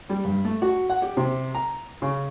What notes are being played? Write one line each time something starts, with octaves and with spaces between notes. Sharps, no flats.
G3
G2
A3
F#4
F#5
G4
C3
A#5
C#3